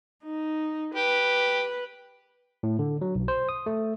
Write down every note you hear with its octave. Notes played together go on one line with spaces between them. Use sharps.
D#4
G4 B4
A2
D3
F#3
B1
C5
D#6
A3